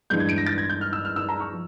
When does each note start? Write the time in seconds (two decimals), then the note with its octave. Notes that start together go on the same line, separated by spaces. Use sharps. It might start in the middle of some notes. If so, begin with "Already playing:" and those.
0.10 G2 E3 G#3 G6
0.20 G#6
0.29 D7
0.38 A#6
0.46 A6
0.58 G#6
0.69 G6
0.81 F6
0.93 E6
1.05 F6
1.16 E6
1.29 A#5
1.40 C#6
1.51 F3